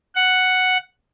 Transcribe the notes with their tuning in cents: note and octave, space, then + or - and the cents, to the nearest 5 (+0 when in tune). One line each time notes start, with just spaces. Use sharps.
F#5 +0